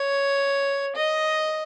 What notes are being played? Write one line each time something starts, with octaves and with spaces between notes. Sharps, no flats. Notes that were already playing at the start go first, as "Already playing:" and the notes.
Already playing: C#5
D#5